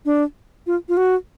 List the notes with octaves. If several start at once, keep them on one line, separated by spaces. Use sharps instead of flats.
D4
F4
F4
F#4